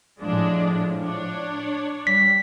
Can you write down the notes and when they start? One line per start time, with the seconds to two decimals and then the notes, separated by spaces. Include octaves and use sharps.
0.20 A2 F3 G#3 D4
1.02 D4 C#5
2.07 G3 B6